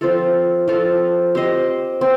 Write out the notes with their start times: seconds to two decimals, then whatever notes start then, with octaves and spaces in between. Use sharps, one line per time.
0.01 F3 C4 F4 A4
0.68 F3 C4 F4 A4
1.35 C4 G4 C5 D#5
2.01 C4